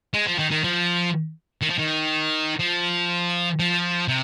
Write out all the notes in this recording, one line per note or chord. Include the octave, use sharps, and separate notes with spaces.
G#3
F3
D#3
D#3
F3
D#3
F3
D#3
F3
F3
C3